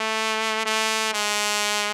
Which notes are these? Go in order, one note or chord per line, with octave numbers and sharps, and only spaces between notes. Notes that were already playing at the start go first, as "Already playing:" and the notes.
Already playing: A3
A3
G#3